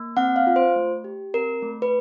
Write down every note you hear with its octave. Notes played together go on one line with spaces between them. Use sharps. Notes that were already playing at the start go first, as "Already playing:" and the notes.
Already playing: A#3
C4 F#5
F5
F4
C5
A3
G4
C4 A#4
A3
B4